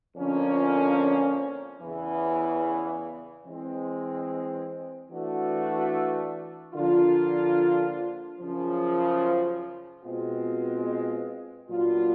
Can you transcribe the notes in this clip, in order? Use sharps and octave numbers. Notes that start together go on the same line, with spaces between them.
F2 D3 F3 A#3 C#4
E2 C#3 E3
E3 G#3 C4
E3 A3 D4 F#4
D3 F3 A#3 D4 F4
F#2 C#3 F3
B2 G#3 C4 F4
A#2 F#3 B3 D4 F4